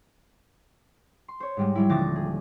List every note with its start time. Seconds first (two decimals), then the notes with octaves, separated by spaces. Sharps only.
1.28 C6
1.40 C5 C#5
1.57 G#2 G3 G#3
1.75 F#3 G3 E4
1.89 D#1 D3 F3 D6 A6 A#6
2.16 G#4